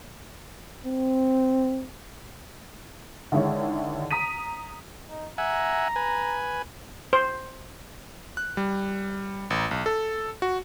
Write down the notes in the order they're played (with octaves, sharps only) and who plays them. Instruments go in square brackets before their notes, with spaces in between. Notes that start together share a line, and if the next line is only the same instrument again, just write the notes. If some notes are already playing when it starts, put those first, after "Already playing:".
[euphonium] C4
[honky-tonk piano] D3 D#3 G#3 E4 C#5
A#5 D#6 B6 D#7
[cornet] D#4
[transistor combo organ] E5 F#5 G#5 [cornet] A#5
[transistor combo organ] B4 G#5
[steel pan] C5
[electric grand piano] F#6
G3
A1
B1
A4
F#4